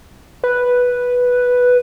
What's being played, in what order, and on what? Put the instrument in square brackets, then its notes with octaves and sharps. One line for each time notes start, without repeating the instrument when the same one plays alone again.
[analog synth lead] B4